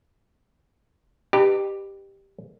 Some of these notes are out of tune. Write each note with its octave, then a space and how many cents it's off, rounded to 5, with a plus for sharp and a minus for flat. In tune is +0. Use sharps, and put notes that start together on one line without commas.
D#4 -45 G4 +0 B4 +0